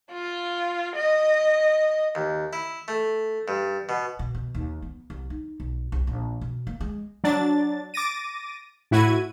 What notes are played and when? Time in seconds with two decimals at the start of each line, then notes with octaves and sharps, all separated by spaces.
0.11 F4
0.96 D#5
2.15 D#2
2.53 E4
2.88 A3
3.48 G2
3.89 B2
4.19 B2
4.35 B2
4.55 D#2
4.82 B3
5.10 C2
5.30 D#4
5.60 B1
5.92 C2
6.07 A#1
6.41 B2
6.67 A#3
6.80 G#3
7.24 F#3 D4 A6
7.94 D6 A6 A#6 D#7
8.91 A2 E4 F#4 G#6 D#7